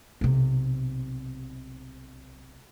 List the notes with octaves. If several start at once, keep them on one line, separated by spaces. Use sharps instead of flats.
B1 C3